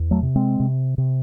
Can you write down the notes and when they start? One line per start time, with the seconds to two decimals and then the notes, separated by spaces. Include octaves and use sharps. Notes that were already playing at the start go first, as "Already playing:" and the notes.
Already playing: E2
0.11 F#3 A3
0.22 C3
0.36 G#3 C4
0.60 C3
0.98 C3